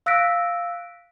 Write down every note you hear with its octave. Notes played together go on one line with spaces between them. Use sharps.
F5 E6 F#6 A#6 B6 D7